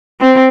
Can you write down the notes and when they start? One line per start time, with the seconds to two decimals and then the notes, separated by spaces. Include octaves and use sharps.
0.21 C4